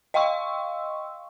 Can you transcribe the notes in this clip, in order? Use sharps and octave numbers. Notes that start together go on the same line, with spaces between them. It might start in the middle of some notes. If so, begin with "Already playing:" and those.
D#5 F5 G5 C6 C#6 E6